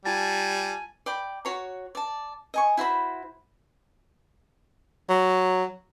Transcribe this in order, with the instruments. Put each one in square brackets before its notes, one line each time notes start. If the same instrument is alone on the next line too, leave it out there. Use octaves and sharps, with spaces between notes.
[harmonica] G3 [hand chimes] F4 A5 A6 [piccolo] G#5
[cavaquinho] D5 G5 B5
F#4 C#5 A#5
D5 A5
D#5 G#5 C#6
E4 F#4 C5 B5
[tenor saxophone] F#3